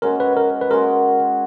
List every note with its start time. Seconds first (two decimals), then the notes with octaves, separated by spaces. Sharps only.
0.02 G#3 C#4 F#4 A#4
0.20 B4
0.37 A#4
0.61 B4
0.71 G#3 C#4 F#4 A#4